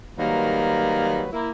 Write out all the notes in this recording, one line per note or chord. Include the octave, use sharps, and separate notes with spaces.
D#3 F#3 G3 A#3 B4
A#3 E4